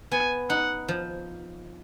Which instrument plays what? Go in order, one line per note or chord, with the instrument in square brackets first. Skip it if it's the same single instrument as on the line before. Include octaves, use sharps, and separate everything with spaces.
[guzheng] B3 [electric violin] G#5
[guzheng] D#4 [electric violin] F#5
[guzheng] F3